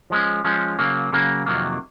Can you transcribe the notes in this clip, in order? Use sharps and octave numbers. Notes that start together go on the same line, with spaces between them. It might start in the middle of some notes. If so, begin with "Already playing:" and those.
F3 G#3 C#4
F3 G#3 C#4
C#3 F#3 A#3
C#3 F#3 A#3
F2 C3 D#3 F#3 A#3